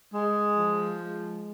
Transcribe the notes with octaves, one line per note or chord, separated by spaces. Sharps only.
G#3
F3
G#3